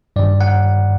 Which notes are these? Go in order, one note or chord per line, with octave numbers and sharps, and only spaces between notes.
G2 D#3 D5
F#5